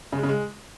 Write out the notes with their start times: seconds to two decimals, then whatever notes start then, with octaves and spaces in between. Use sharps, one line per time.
0.12 C#3
0.18 G#3
0.23 C#3
0.29 G#3